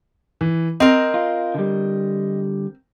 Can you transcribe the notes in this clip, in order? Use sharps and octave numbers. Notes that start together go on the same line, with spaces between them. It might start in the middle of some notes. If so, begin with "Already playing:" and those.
E3
C4 A#4 D#5
F4
D3 G3